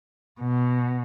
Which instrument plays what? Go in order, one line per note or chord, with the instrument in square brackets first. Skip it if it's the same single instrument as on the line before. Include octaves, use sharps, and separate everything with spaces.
[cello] B2